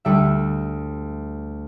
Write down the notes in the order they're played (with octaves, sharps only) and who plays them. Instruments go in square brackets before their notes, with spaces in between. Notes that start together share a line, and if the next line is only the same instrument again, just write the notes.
[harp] D2 G3 E5